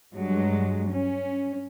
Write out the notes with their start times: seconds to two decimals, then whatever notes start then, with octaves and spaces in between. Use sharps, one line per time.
0.14 G2 F#3 G#3
0.91 C#4